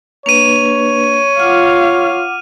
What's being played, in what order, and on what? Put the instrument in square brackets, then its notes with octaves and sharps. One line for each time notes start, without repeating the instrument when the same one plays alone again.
[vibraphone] A#3 D4 B4 [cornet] C#5 [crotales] D#7 F7
[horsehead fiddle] F4 F5 [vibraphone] F#5 D6 [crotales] F6